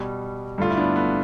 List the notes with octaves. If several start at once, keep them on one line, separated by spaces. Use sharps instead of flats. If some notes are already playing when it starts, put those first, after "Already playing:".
Already playing: B2 G3
G2 D3 A3 F4
E4
B3 D4
B3